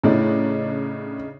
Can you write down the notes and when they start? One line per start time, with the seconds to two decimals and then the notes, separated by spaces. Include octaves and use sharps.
0.03 A2 C#3 D4 D#4